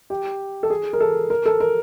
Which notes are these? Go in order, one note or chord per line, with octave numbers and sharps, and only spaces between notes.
G4
A4
G#4
A#4
A4
A#4
A4
A#4